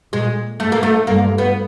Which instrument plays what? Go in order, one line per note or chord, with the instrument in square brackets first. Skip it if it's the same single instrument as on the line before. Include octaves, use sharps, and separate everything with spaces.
[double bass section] A#2 [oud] G#3
[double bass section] G#2 [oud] A3
[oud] A#3
A3
[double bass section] G2 [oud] A#3
[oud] B3